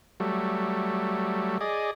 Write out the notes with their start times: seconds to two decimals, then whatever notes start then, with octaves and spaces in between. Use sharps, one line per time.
0.20 F#3 G3 A3
1.61 G#4 D5 D#5